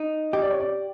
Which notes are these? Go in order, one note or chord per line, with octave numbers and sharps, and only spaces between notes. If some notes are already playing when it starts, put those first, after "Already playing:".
Already playing: D#4
G4 D#5
D5
C#5
D5